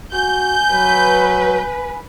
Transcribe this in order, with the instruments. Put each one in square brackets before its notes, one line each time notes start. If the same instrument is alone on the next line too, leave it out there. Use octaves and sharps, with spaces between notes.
[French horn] F#4 [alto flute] G#5 [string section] G6
[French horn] F#3 [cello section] B4